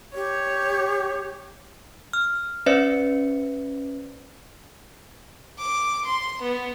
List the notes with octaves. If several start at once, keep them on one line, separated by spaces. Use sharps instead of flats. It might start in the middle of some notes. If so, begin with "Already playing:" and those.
G4 C#5
F6
C#4 B4 C5 D5 E5 C#7
D6
C6
B3